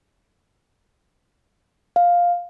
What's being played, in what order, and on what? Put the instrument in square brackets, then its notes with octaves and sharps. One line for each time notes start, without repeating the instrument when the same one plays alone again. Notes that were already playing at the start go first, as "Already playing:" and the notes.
[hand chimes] F5